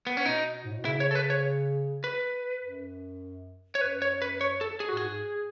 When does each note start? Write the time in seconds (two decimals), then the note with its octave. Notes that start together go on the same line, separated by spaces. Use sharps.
0.07 B3
0.17 C#4
0.25 B2 D#4
0.64 G#2
0.71 A2
0.78 B2
0.85 C#3 E4
1.00 C#5
1.11 A4
1.15 B4
1.30 C#5
2.04 B4
2.63 F#2
3.75 C#5
3.81 F#2 B4
4.02 C#5
4.22 B4
4.41 C#5
4.61 A4
4.80 G#4
4.88 F#4
4.93 A2
4.97 G#2 G#4